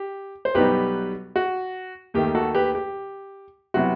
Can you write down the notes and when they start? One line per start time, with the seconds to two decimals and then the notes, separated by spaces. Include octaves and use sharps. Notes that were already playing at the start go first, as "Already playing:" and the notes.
Already playing: G4
0.45 C5
0.55 B1 B2 G3 B3 D#4 G4 B4
1.36 F#4
2.14 D#2 D#3 A3 G4
2.35 F#4 A4
2.55 G4 B4
2.75 G4
3.74 C3 F#3 B3 E4 F#4